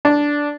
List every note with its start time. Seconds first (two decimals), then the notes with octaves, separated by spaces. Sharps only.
0.05 D4